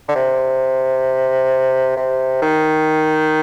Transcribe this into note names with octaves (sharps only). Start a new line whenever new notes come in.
D3
C3
C3
D#3